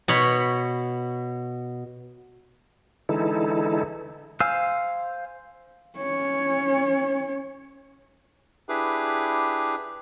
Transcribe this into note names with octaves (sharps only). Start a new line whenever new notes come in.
B2 C#5 B5
D3 E3 G#3 D#4 E4 A4
C5 F5 G#5 E6 F6
C#4 C#5
D4 E4 G4 G#4 B4